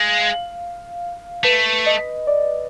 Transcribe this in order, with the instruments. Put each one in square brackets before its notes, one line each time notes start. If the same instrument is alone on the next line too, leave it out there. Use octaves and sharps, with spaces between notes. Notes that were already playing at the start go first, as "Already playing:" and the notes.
Already playing: [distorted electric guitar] G#3 [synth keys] F5
[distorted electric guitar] A3 [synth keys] B4
[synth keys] D#5
D5